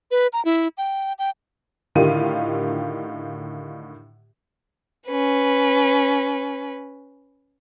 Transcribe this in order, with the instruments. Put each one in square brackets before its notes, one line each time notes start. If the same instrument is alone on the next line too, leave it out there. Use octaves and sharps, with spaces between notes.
[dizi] B4
A#5
E4
G5
G5
[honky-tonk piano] A2 D3 D#3 F4 G4 D#7
[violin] C#4 B4